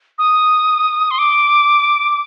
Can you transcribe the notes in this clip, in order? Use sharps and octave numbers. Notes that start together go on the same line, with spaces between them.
D#6
C6
D6